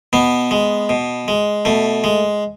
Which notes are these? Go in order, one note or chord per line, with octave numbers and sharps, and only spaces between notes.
B2 B3
G#3
B2
G#3
B2 A3
G#3